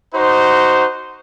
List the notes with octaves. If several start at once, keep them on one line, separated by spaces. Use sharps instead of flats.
D#4 F#4 C5